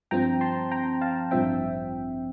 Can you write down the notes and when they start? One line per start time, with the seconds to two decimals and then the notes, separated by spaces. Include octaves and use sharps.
0.11 G2 F3 C4 G5 A#5
0.41 A5 C6
0.71 G5 A#5
1.01 F5 A5
1.31 A1 G2 F3 C4 E5 G5